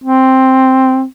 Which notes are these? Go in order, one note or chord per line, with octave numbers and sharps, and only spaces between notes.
C4